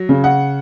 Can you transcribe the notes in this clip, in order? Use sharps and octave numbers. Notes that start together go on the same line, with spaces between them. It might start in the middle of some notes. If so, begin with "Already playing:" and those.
Already playing: F#3
C#3
F#5